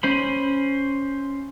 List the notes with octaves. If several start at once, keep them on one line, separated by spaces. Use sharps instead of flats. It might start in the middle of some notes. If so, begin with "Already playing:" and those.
C#4 C5 B5